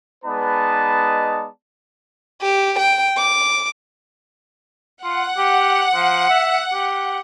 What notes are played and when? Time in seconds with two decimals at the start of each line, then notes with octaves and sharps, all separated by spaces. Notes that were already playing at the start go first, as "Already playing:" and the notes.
0.25 G#3 B3 D#4 B4 D5 A5
2.42 G4
2.79 G5
3.18 D6
5.04 F4 F#5
5.37 G4
5.95 F3
6.30 E5
6.73 G4